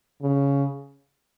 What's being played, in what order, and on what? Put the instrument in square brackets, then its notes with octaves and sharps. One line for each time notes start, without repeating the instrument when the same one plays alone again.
[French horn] C#3